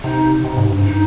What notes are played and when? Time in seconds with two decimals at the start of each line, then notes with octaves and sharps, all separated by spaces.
0.04 C3 D#4
0.44 C3
0.57 G#2
0.70 G2
0.84 D#4